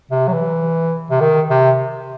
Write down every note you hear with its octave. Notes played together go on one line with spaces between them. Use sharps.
C3
F#3
E3
C3
D#3
C3